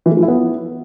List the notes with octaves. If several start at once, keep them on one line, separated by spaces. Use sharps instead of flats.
E3
A3
F3
E4
B3